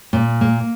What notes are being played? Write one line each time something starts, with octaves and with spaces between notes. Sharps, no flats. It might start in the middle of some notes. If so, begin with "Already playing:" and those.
A#2
A#3